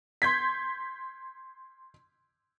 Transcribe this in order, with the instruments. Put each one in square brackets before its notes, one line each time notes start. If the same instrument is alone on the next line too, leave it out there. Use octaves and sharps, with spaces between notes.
[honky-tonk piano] C6 G6 G#6 B6